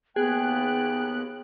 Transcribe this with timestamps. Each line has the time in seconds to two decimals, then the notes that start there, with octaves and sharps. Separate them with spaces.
0.16 D#2 B3 G#4 G5 F#6